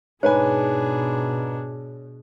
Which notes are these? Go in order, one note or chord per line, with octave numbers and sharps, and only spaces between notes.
G#2 B2 D4 G#4 B4 C#5 G#5